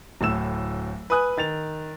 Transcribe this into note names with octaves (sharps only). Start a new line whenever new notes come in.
D1 A2 E6 E7
B4 G#5 D#6 F#6
D#3 A6 F7